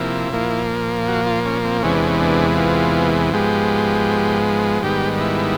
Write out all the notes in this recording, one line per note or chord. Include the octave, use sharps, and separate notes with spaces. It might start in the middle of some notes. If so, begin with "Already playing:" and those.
Already playing: C3 F3 A#3 E4
A#2 F3 A#3
F#4
F4
C#4
C4
E2 C3 E3 G#3 B3 C#4
D4
C#4
D4
F4
G#2 F3 G#3 B3 G4
G#2 D#3 G3 B3 G4
E4